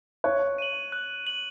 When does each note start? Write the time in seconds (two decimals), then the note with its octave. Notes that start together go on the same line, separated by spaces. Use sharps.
0.24 C#5 F#6
0.58 D#7 F#7
0.92 F#6
1.27 D#7 F#7